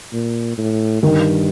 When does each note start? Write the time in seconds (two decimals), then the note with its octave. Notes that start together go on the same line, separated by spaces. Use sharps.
0.13 A#2
0.58 A2
1.02 G2 D#3